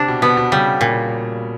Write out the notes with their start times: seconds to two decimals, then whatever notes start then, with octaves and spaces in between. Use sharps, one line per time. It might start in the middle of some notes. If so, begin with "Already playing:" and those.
Already playing: C3 D4
0.08 B2
0.22 B2 B3
0.37 B2
0.52 C#3 G3
0.81 A#2